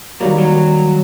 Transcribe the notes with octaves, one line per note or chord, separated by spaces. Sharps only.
D#3 F#3 G3 A#3
F#3